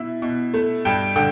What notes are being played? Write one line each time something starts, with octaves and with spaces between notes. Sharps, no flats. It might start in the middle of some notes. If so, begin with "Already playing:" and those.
Already playing: B2 E4
B2
A3
G2 G5
D3 G5